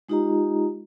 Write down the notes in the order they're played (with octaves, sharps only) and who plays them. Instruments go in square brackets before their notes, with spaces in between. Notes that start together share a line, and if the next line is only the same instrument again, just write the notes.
[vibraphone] G#3 D#4 F4 G4 D#5 A#5